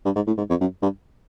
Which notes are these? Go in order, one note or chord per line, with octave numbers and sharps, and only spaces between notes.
G2
G#2
A2
G#2
F2
F#2
G2